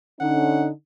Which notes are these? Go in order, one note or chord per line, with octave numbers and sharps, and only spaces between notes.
D3 C#4 D#4 F#5